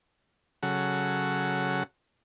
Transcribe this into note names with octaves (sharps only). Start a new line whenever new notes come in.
C#3 F#3 A4 F#5